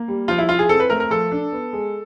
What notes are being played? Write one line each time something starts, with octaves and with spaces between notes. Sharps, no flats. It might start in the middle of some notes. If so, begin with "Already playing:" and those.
Already playing: A#3
G3
F3 F4
E4
E4 F4
G#4
C4 A4
B4
A3 A#4
A#4
F3 A4
D4
B3
G#3